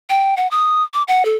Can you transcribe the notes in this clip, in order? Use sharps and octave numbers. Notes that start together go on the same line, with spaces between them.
G5
F#5
D#6
D6
F#5
A4